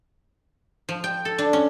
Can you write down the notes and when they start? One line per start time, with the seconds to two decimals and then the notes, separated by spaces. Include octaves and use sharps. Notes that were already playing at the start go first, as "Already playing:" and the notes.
0.89 F3
1.04 G5
1.25 A4
1.38 D4
1.53 C#4